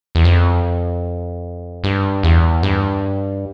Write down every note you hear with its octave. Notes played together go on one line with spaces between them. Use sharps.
E2
F2
G2
E2
G2